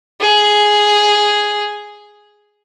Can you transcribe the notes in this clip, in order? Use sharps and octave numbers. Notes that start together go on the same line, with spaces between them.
G#4